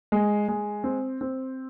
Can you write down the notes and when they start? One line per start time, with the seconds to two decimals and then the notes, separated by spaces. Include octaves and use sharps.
0.12 G#3
0.48 G#3
0.84 C4
1.21 C4